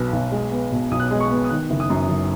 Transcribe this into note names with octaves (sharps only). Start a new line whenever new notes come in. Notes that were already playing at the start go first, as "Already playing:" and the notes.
Already playing: B1 B2 B3 F#6
B1
G#3
B3
B2
B1 D#6
F#6
D#6
G#3
C#6
B3
D#6
D#3 F#6
F#1
D#6
F#2
F#1